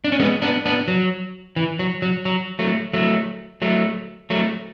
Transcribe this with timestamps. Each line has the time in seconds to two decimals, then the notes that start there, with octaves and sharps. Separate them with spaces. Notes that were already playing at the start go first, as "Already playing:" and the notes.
0.04 D4
0.12 C#4
0.20 G#3 B3
0.42 B3 D4
0.65 B3 D4
0.88 F#3
1.56 E3
1.79 F#3
2.02 F#3
2.25 F#3
2.59 F#3 A3
2.93 F#3 A3
3.62 F#3 A3
4.30 F#3 A3